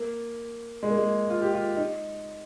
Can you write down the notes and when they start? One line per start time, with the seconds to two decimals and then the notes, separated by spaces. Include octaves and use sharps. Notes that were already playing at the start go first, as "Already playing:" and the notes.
Already playing: A#3
0.83 G#3
0.90 A#3
0.98 G#3
1.30 F4
1.42 G4
1.54 F4
1.77 D#4